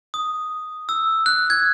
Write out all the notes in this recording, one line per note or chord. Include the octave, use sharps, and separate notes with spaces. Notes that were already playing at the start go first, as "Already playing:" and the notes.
D#6
E6
F#6
G#6